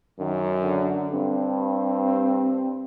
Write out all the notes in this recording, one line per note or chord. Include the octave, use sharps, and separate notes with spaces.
F#2 D#3
D3
G2 C4